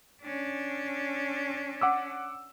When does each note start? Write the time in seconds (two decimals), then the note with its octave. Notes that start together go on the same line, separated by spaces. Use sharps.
0.22 C#4 D4
1.81 F#5 D6 E6